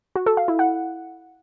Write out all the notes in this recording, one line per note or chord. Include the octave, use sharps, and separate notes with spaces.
F#4
A4
F5
E4
F#5